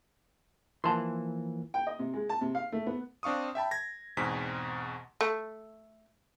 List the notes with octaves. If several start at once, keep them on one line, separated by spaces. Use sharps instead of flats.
E3 F3 A#3 A5 C6
G5
D#5
C3
G#3
A5
C3
F5
A3
B3
C4 D4 F5 C#6 D#6
E5 G5 A5 B5
G#6 A#6
E2 G#2 B2 C4 B6
A3